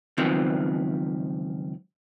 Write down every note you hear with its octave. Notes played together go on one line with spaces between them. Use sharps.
C#2 F#2 D#3 F3 B3 C4